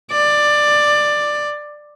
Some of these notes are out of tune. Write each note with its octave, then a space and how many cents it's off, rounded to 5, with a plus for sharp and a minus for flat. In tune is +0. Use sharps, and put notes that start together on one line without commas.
D5 +15